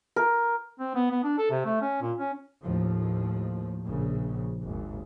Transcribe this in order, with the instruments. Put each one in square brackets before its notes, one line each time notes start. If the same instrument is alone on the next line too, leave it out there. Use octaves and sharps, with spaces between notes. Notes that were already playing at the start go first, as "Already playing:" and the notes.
[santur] A#4
[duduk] C4
B3
B3
D4
A4
C3
A3
C#4
A#2
C#4
[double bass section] D#2 A2 F3
A#1 C#3
G#1 D#2